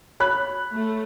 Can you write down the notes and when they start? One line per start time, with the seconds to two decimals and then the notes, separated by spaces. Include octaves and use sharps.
0.20 C#5 B5 F#6
0.73 A3